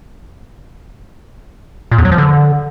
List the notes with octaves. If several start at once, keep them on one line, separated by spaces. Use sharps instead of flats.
A#2
E2
F#3
F3
D3